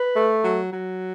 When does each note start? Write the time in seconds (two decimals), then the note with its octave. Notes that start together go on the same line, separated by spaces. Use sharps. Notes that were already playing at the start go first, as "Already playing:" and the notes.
Already playing: B4
0.14 A3
0.43 F#3
0.72 F#3